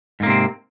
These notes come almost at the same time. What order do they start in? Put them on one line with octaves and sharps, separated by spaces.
G#2 A#3 C3 C4